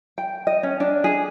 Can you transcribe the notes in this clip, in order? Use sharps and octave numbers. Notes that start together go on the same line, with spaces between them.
G5
D#5
C#4
D4
G#4